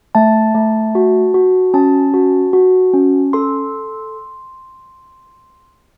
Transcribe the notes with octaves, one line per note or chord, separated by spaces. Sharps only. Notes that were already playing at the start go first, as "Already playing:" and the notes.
A3 A5
A3
F#4
F#4
C#4 A5
F#4
F#4
C#4
A4 C6